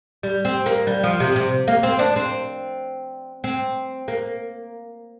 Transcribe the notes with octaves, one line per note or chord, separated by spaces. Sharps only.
G3
C4
A#3
G3
F3
C3
C3
A#3
C4
D4
C4
C4
A#3